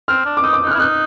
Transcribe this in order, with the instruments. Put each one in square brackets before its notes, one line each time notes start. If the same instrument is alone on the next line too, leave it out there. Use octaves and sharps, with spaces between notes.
[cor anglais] C4 [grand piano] F6
[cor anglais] D4
[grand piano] D6
[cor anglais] D#4 [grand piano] D#6
[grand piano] D6
[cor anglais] D#4 [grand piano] F#6
[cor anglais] E4 [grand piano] F6
[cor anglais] D#4 [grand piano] F#6